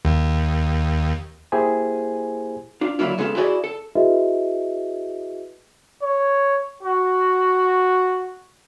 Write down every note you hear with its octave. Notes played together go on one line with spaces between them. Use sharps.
D#2
A#3 E4 G4 G#4 C5 G#5
D4 F4
D3 F3 F#3 A#3 E4 F4
C#3 G#3 B3 F4 G4 A4
E4 F#4 G#4 B4 D5 D#5
A4
E4 F#4 G#4 B4 D#5 E5
C#5
F#4